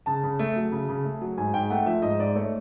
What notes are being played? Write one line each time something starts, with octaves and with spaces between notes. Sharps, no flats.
C#3 A5
C#3
A3
F#3
C#3
C#3
A3
F#3
G#2 G#5
G#2 G5
A3 F#5
F3 E5
G#2 D#5
G#2 D5
A3 C#5